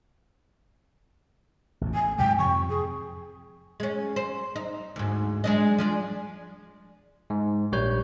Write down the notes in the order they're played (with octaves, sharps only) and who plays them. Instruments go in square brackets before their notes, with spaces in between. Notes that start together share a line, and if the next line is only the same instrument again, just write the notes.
[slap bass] A1 F2
[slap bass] A2 [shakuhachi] G#5
[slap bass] G#2 C3 F#3 [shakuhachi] G5
[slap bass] F2 C3 F3 [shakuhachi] C#6
[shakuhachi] G#4
[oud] G#3 C#4
C5
D#4
D2 G#2
G#3 D4 D#5
F3 G#3 D4
[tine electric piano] G#2
A#1 G3 C#5 G6